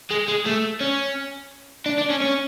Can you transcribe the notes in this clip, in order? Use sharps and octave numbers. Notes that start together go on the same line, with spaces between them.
G#3
G#3
A3
C#4
D4
D4
C#4
C#4